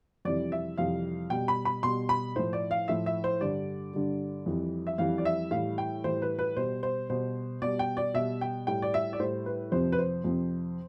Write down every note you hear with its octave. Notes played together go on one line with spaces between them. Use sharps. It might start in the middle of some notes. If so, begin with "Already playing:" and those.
F2 C3 E3 G3 D5
E5
F2 C3 E3 G3 F5
B2 G3 G5
B5
B5
B2 G3 C6
B5
A2 F3 C5
D5
F5
A2 F3 E5
E5
C5
G2 D3 G3 D5
G2 D3 G3
F2 E3 G3
E5
F2 E3 G3 F5
D5
E5
A2 E3 G3 F5
G5
A2 E3 G3 C5
B4
B4
B2 G3 C5
C5
B2 G3 C5
B2 G3 D5
G5
D5
B2 G3 E5
G5
A2 G3 G5
D5
E5
D5
A2 G3 C5
B4
F2 C3 F3 C5
B4
C5
F2 C3 F3